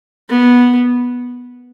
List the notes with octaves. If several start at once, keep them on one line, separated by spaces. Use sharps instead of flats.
B3